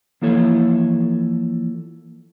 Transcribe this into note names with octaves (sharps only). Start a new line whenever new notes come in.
E3 F3 A#3 E4 A4 C#5